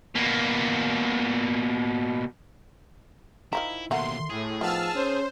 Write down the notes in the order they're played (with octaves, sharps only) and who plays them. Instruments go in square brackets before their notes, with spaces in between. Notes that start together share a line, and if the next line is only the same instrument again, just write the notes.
[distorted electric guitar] B2 A#3
[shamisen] D#3 F3 A#5 [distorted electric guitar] E4
[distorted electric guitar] D#2 B2 [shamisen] A3 A#4 F#5 [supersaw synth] C6
[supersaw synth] A2 [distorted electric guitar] G#4
[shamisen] D#3 B3 [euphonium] F3 [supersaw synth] A5 E6 F6
[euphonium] C#4 [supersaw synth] C5